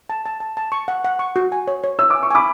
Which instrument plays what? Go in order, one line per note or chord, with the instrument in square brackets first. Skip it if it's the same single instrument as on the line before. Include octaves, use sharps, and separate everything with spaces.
[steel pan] A5
A5
A5
A5
C#6
F#5
F#5
C#6
F#4
G#5
C#5
C#5
[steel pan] C#5 [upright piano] E6
[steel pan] G#5 [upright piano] D6
[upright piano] C#6
[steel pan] G#5 [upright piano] B5 D6